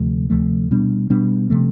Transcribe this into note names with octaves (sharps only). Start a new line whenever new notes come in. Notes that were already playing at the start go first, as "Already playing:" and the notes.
Already playing: D2 C3 F3 A3
D2 C3 F3 A3
B2 G3 B3 D4
B2 G3 B3 D4
C3 F3 A3